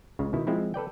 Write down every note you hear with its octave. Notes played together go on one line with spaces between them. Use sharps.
C#2 C#3
B2 D#3 E4
F3 G#3 C4 E4
A4 B4 D5 G5